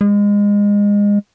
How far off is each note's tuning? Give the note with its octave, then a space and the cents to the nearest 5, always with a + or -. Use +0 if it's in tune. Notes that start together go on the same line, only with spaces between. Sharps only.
G#3 -25